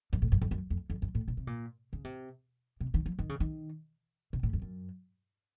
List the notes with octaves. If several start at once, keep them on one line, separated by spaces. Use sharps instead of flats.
F#2
A2
F#2
F2
F#2
F2
F2
F#2
A2
A#2
C3
A#2
C#3
C3
C3
D#3
F3
D#3
C#3
D#3
C3
A2
F2
F#2